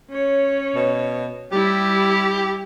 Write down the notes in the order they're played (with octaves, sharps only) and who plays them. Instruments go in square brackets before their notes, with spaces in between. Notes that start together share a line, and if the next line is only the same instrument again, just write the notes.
[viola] C#4 C#5
[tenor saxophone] B2
[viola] G3 E4 [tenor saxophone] G4